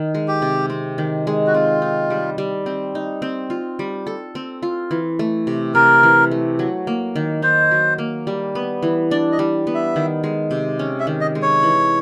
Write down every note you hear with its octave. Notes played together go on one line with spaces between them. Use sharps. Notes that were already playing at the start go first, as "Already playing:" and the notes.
Already playing: D#3
G#3
G4
C3
C4
D#3
G#3
F#4
C4 F4
D#4
G3
G3
C4
D#4
C4
F4
G3
A4
C4
F4
E3
A3
C3
C3 A#4
E3
A3
F#3
A#3
D#3
D#4 C5
F#3
A#3
G3
B3
E3
D4 D5
D#5
G3
B3
E5
D#3
G#3
C3
C#4
E5
D#3
D#5
G#3
C#5
E3